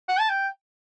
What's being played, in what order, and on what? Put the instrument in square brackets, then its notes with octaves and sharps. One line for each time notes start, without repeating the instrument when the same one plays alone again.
[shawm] F#5
A5
G5